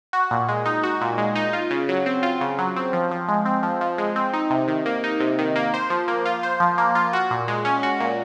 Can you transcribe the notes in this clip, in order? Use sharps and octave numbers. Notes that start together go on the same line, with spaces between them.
F#4
A#2
G#3
D#4
F#4
A#2
G#3
D#4
F4
C#3
F#3
C4
F4
C#3
F#3
C4
F3
F3
G#3
C4
F3
F3
G#3
C4
D#4
C3
D#3
A#3
D#4
C3
D#3
A#3
C5
F3
A#3
F4
C5
F3
A#3
F4
F#4
A#2
G#3
C#4
F#4
A#2